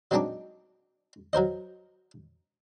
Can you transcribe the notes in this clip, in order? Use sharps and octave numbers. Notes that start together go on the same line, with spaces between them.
F#3 G#3 C4 D4 D#4 D6
F#3 A#4 C5 D#5